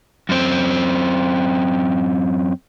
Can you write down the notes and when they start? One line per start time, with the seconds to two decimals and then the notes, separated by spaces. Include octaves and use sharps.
0.29 F#2 C4